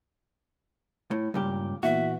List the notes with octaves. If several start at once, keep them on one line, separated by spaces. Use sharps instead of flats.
A2
C#2 G2 A#2 G4
A#2 E3 B3 F#4 E5